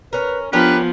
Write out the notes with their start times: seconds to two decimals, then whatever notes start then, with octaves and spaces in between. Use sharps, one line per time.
0.13 C#4 A#4 B4
0.53 F3 B3 C#4 D4 G4 A#4 B4